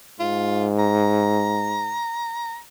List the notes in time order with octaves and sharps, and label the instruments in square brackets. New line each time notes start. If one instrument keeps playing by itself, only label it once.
[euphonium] G#2 [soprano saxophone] F4
[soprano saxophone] A#5